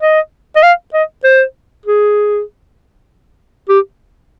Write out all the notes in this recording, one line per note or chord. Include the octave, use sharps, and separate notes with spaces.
D#5
D#5
F5
D#5
C5
G#4
G4